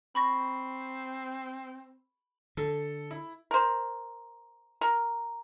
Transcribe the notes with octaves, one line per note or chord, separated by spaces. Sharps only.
C4 B5 C#6 A#6
D3 A4
E4
A#4 C5
A#4